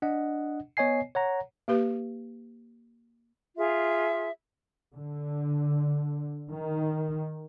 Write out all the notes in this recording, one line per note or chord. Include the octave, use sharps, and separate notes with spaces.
D4 D#5 F#5
B3 C#5 D#5 G#5 C7
C#5 F#5 A#5
A#3 G4 B4
F4 G#4 E5
D3
D#3